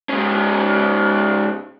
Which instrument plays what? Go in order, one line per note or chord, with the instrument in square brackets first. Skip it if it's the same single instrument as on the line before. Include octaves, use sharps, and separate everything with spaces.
[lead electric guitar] G#2 C#4